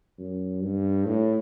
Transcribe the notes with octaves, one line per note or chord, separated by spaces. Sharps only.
F#2
G2
A2